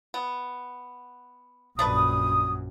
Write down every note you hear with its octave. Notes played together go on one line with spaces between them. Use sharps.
B3
A#1 F#2 A3 D4 B4 D#6